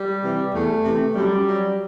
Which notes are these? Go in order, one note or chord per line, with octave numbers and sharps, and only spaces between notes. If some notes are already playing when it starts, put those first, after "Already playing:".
Already playing: G3
C3 E3
E2 A3
C3 E3
F#2 G3
F#3